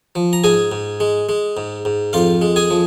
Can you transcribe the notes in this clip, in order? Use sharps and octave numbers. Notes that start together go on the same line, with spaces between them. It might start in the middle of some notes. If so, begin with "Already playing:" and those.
F3
A#5
G#2 G#4 G#5
G#2
G#3
G#3
G#2
G#2
F2 F4 F5
G#3
G#4 G#5
F3